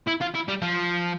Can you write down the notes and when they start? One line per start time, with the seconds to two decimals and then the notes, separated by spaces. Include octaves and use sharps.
0.07 E4
0.21 F4
0.34 E4
0.48 G3
0.62 F3